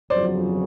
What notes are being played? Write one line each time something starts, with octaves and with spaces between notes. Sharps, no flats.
G1 F2 C#3 F#3 C5 D5